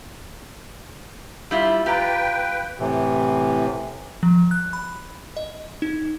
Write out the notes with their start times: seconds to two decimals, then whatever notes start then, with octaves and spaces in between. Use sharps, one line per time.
1.51 G3 E4 F4
1.86 F4 G4 B4 G5 A#5 B5
2.80 A2 C3 E3
4.23 F3
4.51 F#6
4.73 B5
5.37 D#5
5.82 D#4